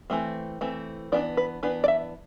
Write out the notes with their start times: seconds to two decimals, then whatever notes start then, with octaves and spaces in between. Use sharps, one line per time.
0.10 E3 A3 C4
0.61 E3 A3 C4
1.12 E3 B3 D4 D5
1.37 B4
1.63 E3 B3 D4 B4
1.84 D5
1.88 E5